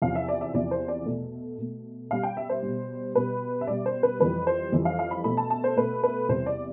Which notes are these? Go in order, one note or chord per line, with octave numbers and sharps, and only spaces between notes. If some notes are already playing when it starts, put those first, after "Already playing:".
E2 C3 F3 F5
E5
D5
E5
E2 C3 F3 D5
C5
D5
B2 A3
B2 A3
B2 G3 F5
G5
E5
C5
B2 G3
B2 G3 B4
E5
B2 G3 D5
C5
B4
F2 E3 G3 B4
C5
F2 E3 G3
F5
F5
B5
B2 A3 B5
A5
A5
C5
B2 A3 B4
B4
E2 C3 G3 C5
D5